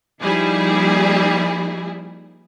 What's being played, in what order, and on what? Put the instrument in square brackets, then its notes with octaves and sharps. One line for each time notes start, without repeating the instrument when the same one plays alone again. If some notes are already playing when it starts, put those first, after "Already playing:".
[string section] F3 G3 A#3 D#4 E4 G#4